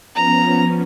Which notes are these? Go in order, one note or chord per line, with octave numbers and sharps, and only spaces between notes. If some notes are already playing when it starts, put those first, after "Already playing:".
F3 B3 C#4 A#5